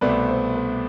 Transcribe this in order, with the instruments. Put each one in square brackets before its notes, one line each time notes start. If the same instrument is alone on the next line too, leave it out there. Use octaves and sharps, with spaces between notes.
[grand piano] C2 B2 A3 C4 [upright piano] B4 D5
[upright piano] C5
B4